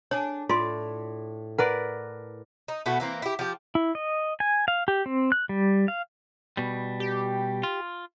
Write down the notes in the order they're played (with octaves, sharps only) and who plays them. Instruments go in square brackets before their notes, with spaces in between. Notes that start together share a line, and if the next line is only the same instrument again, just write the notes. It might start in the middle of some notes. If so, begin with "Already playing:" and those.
[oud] D4 G#4 [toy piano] C#5
[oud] A2 [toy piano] F4 C6 [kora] D5
[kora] A#4 B4 D5 [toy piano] F#5
[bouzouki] D#4
B2 A3 B3 F#4
E3 A#3 C4
E4 G4
F3 G4
[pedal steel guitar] E4
D#5
G#5
F5
G4
C4
F#6
G3
F5
[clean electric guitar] B2 G3
[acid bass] G4
[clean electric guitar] F4